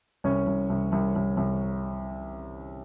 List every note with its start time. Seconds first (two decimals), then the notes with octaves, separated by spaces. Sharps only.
0.24 C2 C#4 C#5
0.47 C2
0.70 C2
0.92 C2
1.16 C2
1.37 C2